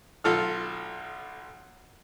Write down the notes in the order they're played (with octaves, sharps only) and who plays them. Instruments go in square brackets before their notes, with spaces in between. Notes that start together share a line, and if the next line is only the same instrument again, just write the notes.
[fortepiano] B1 F4 A4 F6